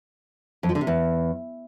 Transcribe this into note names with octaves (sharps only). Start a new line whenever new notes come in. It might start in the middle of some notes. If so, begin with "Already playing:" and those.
F2
F3
D3
C3
E2